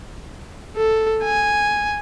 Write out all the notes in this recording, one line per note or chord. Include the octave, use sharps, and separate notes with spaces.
A4
G#5